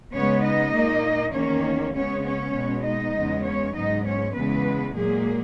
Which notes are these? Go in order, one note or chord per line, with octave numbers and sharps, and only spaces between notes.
C#3 G#3 B3 C#4 C#5
D#4 D#5
A#2 A#3
E2 D#3 A#3 C#4 C#5
C#3 G#3 B3 C#4 C#5
C#4 C#5
B2 G#3 B3
D#4 D#5
E2 C#3 G#3 B3
C#4 C#5
G#2 F#3 B3 D#4 D#5
C#4 C#5
E2 C#3 E3 G#3 B3 B4
A#2 F#3 G#3 A#3 G#4